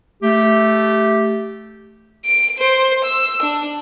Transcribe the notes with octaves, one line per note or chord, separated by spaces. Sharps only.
A3 G4
D7
C5
E6
D4